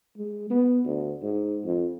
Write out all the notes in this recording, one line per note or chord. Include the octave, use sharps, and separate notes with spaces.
G#3
B3
D2
G#2
F2